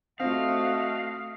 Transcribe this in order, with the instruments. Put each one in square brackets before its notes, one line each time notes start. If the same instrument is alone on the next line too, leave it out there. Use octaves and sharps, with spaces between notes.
[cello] A3 F#4 [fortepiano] C4 F4 [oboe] D#5 [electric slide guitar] F5